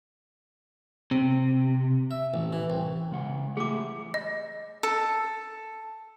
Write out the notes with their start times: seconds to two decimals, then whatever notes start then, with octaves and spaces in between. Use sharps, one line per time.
1.11 C3 C4
2.11 E5
2.34 A1
2.53 E3
2.70 C2
3.11 C#3 G#3 F#5
3.57 E3 A3 G4 G#4 D6
4.14 D#5
4.83 A4